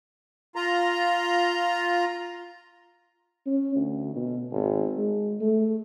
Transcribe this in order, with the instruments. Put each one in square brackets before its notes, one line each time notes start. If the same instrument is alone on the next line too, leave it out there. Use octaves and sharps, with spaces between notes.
[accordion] F4 A#5
[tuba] C#4
D2
B2
G#1
G#3
A3